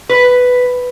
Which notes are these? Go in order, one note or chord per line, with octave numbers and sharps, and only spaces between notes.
B4